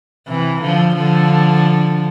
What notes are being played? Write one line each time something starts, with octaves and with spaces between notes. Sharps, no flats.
C3 E3
D3 F3
D3 F3